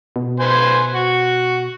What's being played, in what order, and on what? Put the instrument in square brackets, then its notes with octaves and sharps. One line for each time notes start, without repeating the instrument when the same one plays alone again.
[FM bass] B2
[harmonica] B4 C5 G#5
F#4